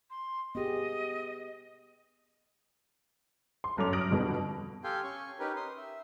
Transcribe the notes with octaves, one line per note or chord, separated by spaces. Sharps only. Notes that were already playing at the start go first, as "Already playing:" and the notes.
C6
B3 G4 G#4 D#5
C6
G1 F#2 A4 D6 F7
D#6 F6 A#6 D7 F#7
F2 B2 D3
G4 A4 F5 G5 G#5 C6
C#4 G#5 C#6
C#4 D#4 G4 A#4 B4
C6 D#6
E5